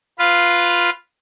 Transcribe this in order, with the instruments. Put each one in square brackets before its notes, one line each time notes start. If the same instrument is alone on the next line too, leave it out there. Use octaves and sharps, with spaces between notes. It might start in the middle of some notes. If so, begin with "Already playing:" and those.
[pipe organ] F4 B4 F5